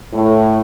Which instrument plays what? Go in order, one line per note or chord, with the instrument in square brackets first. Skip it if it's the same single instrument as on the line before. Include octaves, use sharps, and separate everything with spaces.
[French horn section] A2